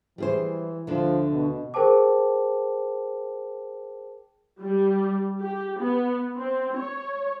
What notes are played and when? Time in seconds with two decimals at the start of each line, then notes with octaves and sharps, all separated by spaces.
0.18 E3 G3 G#4 C5
0.87 D2 D3 F3 D4
1.32 B2
1.74 G#4 A#4 C5 G5 A5 D6
4.62 G3
5.41 G4
5.80 B3
6.36 C4
6.76 C#5